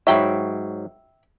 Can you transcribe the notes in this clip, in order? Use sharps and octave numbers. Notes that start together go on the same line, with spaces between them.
G#2 F#3 C#5 E5 G5 B5